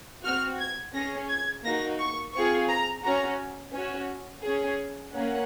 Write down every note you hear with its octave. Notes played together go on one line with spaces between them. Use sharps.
C4 F#4 F6
G#6
C#4 G#4 A#6
G#6
A#3 D#4 F#4 A#6
C#6
C4 F4 G#4 C#6
A#5
C#4 F#4 A#5
C#4 F#4
C#4 G#4
A#3 C#4 F#5